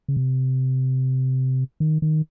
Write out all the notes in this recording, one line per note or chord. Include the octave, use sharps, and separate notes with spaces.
C#3
C3
D#3
D#3